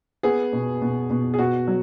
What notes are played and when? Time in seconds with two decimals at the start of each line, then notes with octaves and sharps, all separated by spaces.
0.23 B3 G#4
0.53 B2
0.82 B2
1.10 B2
1.34 G#4
1.39 B2 F#4
1.68 F#3